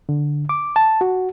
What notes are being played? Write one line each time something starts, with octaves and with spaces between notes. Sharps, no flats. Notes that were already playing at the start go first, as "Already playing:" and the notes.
D3
D6
A5
F#4